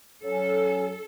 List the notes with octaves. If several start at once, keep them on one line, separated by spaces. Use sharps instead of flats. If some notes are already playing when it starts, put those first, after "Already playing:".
F#3 C#4 A4